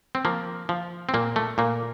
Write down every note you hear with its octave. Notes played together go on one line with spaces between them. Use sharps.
C4
F3 A#3
F3
C4
A#2 A#3
A3
A#2 A#3